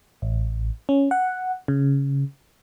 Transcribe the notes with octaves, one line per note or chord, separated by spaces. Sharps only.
A1
C#4
F#5
C#3